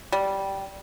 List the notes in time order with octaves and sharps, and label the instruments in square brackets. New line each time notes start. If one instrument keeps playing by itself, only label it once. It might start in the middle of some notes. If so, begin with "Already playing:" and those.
[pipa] G3